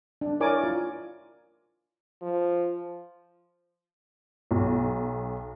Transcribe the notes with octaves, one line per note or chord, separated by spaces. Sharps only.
D4
E4 A#4 C#5 D5 G#5 D6
F4
F3
B1